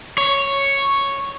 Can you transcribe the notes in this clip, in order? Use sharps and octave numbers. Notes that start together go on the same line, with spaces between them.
C#5